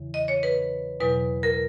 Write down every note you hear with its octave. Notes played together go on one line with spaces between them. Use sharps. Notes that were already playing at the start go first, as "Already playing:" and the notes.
Already playing: E2 C#3 E3
D#5
C#5
B4
E2 B2 F#3 B4
A#4